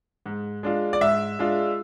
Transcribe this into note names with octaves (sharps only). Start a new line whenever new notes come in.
G#2
G#3 D4 F4
D5
G#2 E5
G#3 D4 F4